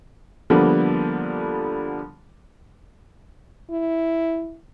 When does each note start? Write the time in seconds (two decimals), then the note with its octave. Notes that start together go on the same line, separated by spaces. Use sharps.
0.50 D3 F3 G3 A#3 B3 D4
3.71 E4